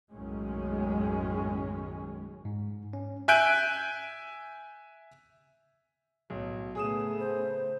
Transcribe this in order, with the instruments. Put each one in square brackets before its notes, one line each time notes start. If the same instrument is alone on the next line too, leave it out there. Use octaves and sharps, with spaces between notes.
[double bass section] B1 F#2 A2 D#3 G#3 C#4
[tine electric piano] G#2
C#4
[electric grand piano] E5 G#5 F#6 G6 D7
[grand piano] B1 [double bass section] A2
[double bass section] C#3 A3 B3 [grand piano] G#4 D#6 E7
[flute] C5